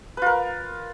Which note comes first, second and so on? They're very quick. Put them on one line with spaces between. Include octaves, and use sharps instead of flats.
B4 F4 A#4